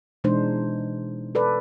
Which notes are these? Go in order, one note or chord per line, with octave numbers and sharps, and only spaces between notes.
B2 E3 G#3 D4 D#4 C5
A4 B4 D5